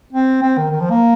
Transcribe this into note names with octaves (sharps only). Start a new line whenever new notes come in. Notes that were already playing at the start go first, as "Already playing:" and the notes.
C4
C4
D#3
D#3
F3
A#3